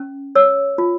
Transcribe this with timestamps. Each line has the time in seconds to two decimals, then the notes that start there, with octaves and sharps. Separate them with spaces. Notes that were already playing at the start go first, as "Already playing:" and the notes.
Already playing: C#4
0.35 C#5 E6
0.78 F4